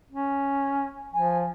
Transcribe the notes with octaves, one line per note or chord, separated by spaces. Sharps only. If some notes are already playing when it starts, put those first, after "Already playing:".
C#4
F3 G#5